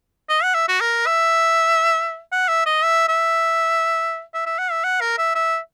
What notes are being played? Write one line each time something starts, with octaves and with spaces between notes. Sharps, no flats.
D#5
F#5
E5
F#4
A#4
E5
F#5
E5
D#5
E5
E5
E5
E5
F#5
E5
F#5
A#4
E5
E5